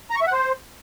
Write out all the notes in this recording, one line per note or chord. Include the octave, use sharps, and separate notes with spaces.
A#5
C#6
E5
F#5
C5